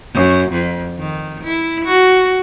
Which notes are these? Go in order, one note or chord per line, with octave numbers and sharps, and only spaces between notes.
F#2
F2
D#3
E4
F#4